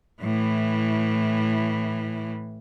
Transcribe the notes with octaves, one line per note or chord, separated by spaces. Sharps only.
A2 E3